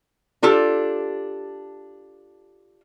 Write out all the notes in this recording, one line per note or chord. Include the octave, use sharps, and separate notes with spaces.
D4 F4 G4 A4